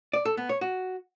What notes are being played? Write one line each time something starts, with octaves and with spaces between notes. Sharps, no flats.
D5
A4
B3
C#5
F#4